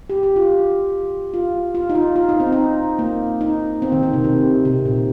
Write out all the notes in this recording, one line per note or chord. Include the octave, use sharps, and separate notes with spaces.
G4
G4
F4
F4
F4
D#4
F4
F4
D#4
C4
D#4
A#3
D#4
C4
D#3
D#3
C3
C3
C3
A#2